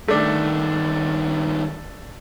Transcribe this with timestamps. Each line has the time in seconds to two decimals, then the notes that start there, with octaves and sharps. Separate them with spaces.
0.08 G2 D#3 A3 D4